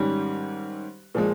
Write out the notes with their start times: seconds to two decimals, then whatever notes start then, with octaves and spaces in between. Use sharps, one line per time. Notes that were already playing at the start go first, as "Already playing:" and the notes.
Already playing: G#2 D#3 G3 C#4 G4
1.15 A#2 F3 G#3